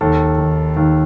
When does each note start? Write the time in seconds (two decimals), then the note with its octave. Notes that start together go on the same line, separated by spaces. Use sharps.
0.01 D#2 A4
0.38 D#3
0.77 D#2